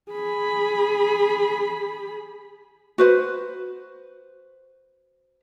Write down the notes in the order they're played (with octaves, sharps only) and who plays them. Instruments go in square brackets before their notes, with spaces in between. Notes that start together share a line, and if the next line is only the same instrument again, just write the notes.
[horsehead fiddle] G#4 B5
[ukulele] F#4 B4 C5